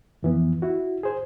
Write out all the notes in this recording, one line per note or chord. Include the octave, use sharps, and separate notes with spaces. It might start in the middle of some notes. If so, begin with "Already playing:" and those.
F2 E3 B3
E4 F#4
G#4 C5